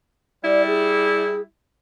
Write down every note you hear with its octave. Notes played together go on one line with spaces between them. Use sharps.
G3 E4 D5
G#4